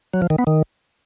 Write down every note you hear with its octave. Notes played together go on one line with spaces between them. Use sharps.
F#3
F3
D#3
B3
D#3